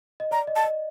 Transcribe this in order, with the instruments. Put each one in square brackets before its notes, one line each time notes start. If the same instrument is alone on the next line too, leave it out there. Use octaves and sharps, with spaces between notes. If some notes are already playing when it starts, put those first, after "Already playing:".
[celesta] D#5
[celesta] D5 [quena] A#5
[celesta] D#5
[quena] A5
[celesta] D#5